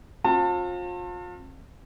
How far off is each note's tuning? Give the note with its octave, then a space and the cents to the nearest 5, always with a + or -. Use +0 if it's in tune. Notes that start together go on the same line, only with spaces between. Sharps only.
C4 +40 F4 +35 A5 +30